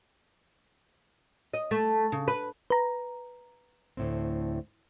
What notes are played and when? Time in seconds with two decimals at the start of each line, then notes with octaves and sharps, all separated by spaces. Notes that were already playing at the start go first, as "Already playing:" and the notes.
1.54 D#5
1.71 A3
2.12 C#3
2.28 B4
2.70 B4 A#5
3.97 D2 A2 C4